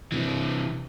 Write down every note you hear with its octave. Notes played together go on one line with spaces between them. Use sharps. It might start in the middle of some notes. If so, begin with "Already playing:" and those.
C3 E3